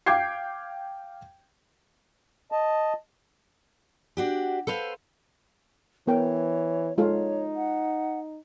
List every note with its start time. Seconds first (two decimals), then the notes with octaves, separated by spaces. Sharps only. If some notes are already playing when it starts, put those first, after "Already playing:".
0.06 F5 G5 D6 G6 G#6 C7
2.52 D#5 A5
4.17 D4 F#4 G4
4.67 A4 B4 C5 F5
6.07 E3 B3 A#4 C#5 G5
6.98 G#3 D#4 F4 A4 C#5
7.56 F#5